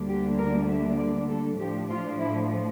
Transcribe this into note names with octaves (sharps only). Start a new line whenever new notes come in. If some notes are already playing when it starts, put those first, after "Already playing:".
Already playing: D2 D3 G3 A#3 D4
G4
A#4
E5
D5
A4
A2 F3 A3 D4 G4
F4
E4